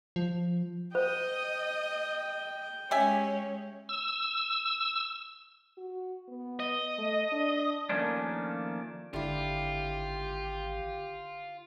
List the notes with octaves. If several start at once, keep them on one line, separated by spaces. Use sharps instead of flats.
F3
C5 D#5 G5
G#3 C#4 G4 C#5 E5 G#5
E6
F#4
B3
D#5
A3
D4
D#3 F3 A3 A#3 C#4 D4
G#1 D3 E4 F4 G4